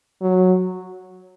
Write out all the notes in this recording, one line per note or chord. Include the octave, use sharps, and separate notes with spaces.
F#3